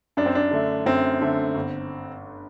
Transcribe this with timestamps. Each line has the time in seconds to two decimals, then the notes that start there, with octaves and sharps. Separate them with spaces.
0.17 F#2 D4
0.26 C4
0.35 D4
0.51 D3 A3
0.86 F#2 C4
1.21 D3 A3
1.55 G1